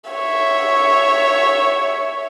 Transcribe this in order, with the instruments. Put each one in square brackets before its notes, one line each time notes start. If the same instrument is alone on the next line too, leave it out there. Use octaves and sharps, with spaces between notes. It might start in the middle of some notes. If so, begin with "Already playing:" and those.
[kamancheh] C#5 E5